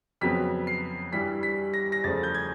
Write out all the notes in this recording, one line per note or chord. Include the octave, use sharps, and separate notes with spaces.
F2 C#3 F#3 B3 B6
C7
G2 E3 G3 B6
B6
A#6
A#6
E2 C#3 F3 A3 A6
G6
G#6